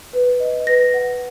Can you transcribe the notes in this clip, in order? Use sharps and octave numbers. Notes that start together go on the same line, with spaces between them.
B4
D#5
B4 A#6
F#5